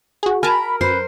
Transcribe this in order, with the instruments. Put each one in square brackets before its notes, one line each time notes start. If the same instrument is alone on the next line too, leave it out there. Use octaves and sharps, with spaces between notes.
[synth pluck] F#4 G#4
[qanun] A#4 [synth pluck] G#5 A5 [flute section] B5
[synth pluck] F#2 [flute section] B4 [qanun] C5